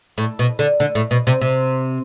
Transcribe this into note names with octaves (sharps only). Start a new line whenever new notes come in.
A2
B2
D3
D3
A2
B2
C3
C3